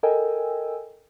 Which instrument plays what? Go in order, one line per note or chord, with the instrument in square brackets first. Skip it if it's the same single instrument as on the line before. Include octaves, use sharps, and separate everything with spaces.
[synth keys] A4 A#4 D#5 G5 G#5 E6